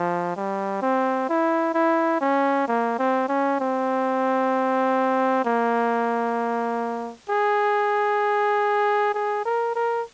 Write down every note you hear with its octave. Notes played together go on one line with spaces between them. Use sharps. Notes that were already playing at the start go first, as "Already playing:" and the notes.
Already playing: F3
G3
C4
E4
E4
C#4
A#3
C4
C#4
C4
A#3
G#4
G#4
A#4
A#4